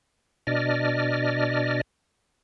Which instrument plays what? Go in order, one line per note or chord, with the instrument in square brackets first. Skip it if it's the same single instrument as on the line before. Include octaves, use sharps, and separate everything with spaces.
[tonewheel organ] B2 D4 D5 D#5 F6